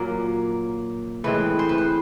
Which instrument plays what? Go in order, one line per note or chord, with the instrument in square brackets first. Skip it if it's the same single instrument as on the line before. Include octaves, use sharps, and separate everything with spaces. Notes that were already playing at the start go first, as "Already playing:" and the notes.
Already playing: [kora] A#2 F#3 A#3
A2 E3 G#3 C4 B4
C5
B4
C5